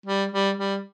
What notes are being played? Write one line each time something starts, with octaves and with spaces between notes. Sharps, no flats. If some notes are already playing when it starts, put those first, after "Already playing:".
G3
G3
G3